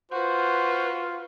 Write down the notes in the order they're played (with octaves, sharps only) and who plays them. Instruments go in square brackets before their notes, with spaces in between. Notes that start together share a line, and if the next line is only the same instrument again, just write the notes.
[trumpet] F4 [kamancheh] F#4 B4 [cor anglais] C5